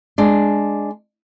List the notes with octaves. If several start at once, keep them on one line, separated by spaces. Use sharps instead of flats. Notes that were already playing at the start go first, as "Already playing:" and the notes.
G#3 D4